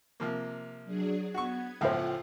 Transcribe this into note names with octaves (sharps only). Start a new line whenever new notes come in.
C3 F3 A#3
F#3 D4 G#4
B3 F#4 C#6 G#6
C#2 A2 F3 F4 C5 E5 F#5 G5